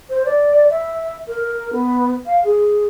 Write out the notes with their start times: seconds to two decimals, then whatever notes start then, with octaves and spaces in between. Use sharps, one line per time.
0.09 C5
0.25 D5
0.70 E5
1.27 A#4
1.73 B3
2.26 F5
2.44 G#4